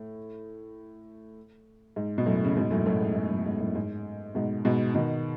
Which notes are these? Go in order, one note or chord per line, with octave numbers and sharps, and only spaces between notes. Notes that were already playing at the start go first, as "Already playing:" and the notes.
Already playing: A2
G#2
B2
F#2 A2
C#3
G#2 B2
F#2 A2
F#2 A2
G#2
G#2
F#2
G#2
F#2 A2
G#2
G#2 B2
G#2 B2
B2 D#3